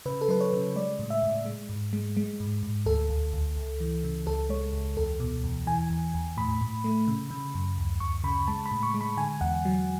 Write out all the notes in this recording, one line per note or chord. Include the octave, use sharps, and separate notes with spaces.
C#3 B4
A4
F#3 B4
C#5
C#3
G#3 D5
A2
E5
A2
G#3
G#2
G#3
G#3
G#2
G#2
D2 A4
D2
D2
C#2
E3
C#3
C#2 A4
G#3 C#5
C#2
E2 A4
B2
E2
E3 G#5
E2
E2
A2 B5
A2
A3
C#3
C#3
F#2
D2
D2 C#6
C#3 B5
G#3 A5
B5
A2
C#6
G#3
B5
D3 G#5
E2 F#5
F#3